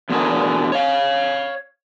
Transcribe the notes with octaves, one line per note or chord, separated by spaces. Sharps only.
E2 B2 D3 A3 G#4 A#4
C#5 F5